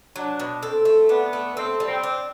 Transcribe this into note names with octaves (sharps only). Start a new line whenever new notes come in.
F#3 D4
B2
C4 A4
A3
B3 D4
A3
C4 A4
G3
C4
D4